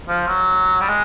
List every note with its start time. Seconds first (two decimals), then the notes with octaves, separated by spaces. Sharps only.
0.08 F3
0.27 F#3
0.81 G3
0.89 G#3